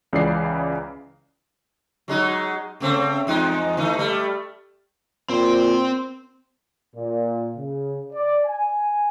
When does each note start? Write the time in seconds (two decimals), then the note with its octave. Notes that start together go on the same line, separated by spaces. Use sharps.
0.13 C#2 C#3 E3 D5 C7
2.08 F#3 G#3 D#4
2.80 C#3 A3 C4
3.27 E2 G#3 D#4
3.77 E3 A3 D#4
3.97 G3 A3
5.29 A#2 C4 C5
6.95 A#2
7.56 C#3
8.13 D5
8.46 G#5